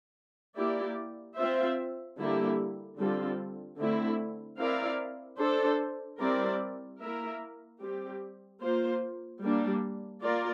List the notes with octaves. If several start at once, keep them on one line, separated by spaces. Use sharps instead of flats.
A#3 E4 G4 D5
C4 F4 C5 E5
D3 G3 A#3 E4 G4
D3 G3 C4 F4 A4
D3 A3 C4 E4
C4 E4 A#4 D5 F5
D4 A4 C5
G3 C4 E4 A#4 D5
A#3 E4 A#4 E5
G3 C4 G4
A#3 F4 C5
G3 A#3 D4
A#3 F4 A#4 D5